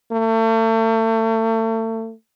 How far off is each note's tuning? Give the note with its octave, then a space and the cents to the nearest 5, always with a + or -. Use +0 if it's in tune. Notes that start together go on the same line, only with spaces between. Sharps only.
A3 +35